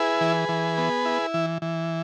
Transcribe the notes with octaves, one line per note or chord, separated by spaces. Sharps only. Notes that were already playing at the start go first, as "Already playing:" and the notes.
Already playing: E4 G#4 B4
E3
E3
B3
E4
E3
E3